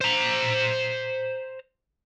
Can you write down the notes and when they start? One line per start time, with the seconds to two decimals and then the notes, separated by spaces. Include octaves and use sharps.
0.01 C5 A#5